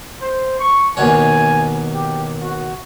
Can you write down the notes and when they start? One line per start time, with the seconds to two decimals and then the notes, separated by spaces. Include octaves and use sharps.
0.21 C5
0.60 C#6
0.97 D#2 B2 C#5 G#5
1.93 G4
2.41 F#4